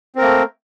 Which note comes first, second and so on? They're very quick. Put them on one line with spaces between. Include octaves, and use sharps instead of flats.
C4 A#4 A#3 A3